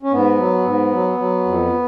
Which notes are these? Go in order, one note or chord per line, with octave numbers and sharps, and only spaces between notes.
C#4
G#2 B3
F#3
G#2
F#3
F#3
F2